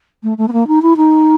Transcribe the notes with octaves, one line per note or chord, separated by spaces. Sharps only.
A3
A3
B3
A#3
D#4
E4
D#4